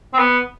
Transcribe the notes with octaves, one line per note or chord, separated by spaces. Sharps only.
C4
B3